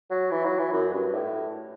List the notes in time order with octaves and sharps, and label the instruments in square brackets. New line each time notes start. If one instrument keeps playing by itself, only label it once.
[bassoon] F#3
E3
F#3
E3
F#2
G2
A2